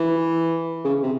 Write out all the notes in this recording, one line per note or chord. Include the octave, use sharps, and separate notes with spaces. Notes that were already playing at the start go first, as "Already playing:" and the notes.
Already playing: E3
C#3
C3